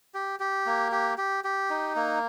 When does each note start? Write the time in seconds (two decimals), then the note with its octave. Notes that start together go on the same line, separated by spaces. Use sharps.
0.14 G4
0.40 G4
0.66 A#3
0.92 G4
1.18 G4
1.44 G4
1.70 D#4
1.96 A#3